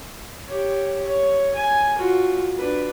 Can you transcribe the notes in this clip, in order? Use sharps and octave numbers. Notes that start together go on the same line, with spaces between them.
G4 C#5
C#5
G#5
F4 F#4
D4 B4